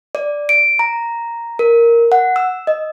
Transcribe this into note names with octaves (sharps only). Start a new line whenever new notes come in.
D5
D7
A#5
A#4
F#5
E6
D#5